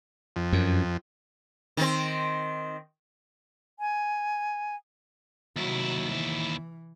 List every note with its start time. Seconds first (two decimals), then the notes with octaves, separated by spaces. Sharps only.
0.36 F2
0.53 F#2
1.77 D#3 C4
3.80 G#5
5.56 D#2 C3 F#3 E4
6.11 E3